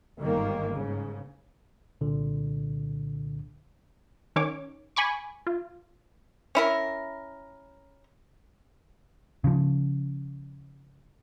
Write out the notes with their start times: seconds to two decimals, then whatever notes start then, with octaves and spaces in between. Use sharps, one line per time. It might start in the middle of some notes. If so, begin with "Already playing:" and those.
0.19 G1 G#2 D#3 G3 A#3
0.73 G#2 C#3
2.01 C2 A#2 D3
4.36 D#3 C#4 C#5 D6
4.96 G#5 B5 C#6 D6
5.47 F4
6.55 C#4 E4 A#4
9.44 C#3 F3